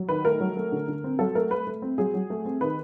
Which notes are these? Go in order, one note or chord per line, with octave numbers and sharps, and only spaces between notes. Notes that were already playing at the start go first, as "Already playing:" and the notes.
Already playing: F#3
D#3 B4
A3 A#4
F#3
A3
D3
D3
C4
F#3 A4
A3 A#4
A3 B4
A3
C4
F#3 G#4
F#3
A3
C4
D#3 B4